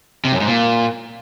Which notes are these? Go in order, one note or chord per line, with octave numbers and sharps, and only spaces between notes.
C3
F#2
G#2
A#2